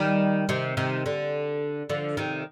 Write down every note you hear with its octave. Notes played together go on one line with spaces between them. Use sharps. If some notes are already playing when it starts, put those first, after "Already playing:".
Already playing: D#3 G3
C3 D#3
C3 D#3
D3
D3 F3
C3 D#3